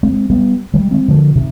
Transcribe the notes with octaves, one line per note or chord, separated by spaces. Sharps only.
G#3 C4
G3 B3
D#3 G3
G#3 C4
D3 F3
C3 D#3